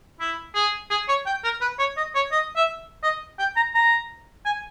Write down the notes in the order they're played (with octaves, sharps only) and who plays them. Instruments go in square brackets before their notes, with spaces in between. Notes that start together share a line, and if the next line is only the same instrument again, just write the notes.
[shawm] E4
G#4
G#4
C#5
G5
A#4
B4
C#5
D#5
C#5
D#5
E5
D#5
G5
A#5
A#5
G#5